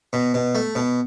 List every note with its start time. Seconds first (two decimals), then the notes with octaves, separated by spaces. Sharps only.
0.13 B2
0.34 B2
0.55 A3
0.75 B2